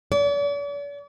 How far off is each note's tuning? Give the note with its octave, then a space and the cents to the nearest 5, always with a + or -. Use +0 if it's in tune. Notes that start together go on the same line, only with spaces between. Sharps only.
D5 -45